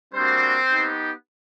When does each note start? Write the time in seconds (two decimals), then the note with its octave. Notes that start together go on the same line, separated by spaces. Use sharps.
0.14 G3 A#3 C4 D4 F#4 C5
0.69 B3 D#4 G4